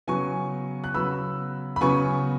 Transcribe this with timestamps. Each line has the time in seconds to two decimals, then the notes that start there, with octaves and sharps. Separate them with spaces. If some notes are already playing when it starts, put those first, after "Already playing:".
0.08 C#3 F#3 B3 G#5 C#6
0.84 F#6
0.94 C#3 F#3 B3 B5 E6
1.76 B5
1.81 C#3 F#3 B3 G#5 C#6